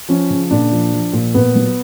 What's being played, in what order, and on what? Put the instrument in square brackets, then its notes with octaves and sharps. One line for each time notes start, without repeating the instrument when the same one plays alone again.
[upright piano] F3 C#4
C#3
A#2 D4
F3
F3
A#2
A#2 B3
F#3